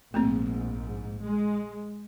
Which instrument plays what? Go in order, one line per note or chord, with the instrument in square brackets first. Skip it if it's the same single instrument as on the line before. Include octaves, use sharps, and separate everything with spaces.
[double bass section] A#1 G#2 [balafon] A3 A#3 C4
[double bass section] G#3